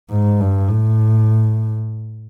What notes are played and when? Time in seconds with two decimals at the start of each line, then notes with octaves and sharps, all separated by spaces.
0.11 G#2
0.40 G2
0.69 A2